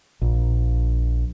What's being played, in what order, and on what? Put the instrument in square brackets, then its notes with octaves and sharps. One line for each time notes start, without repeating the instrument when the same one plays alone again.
[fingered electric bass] A#1